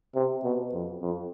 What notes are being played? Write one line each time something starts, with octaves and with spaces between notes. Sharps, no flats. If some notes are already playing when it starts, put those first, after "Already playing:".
C3
B2
F2
F2